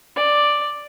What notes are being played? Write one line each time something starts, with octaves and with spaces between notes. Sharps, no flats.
D5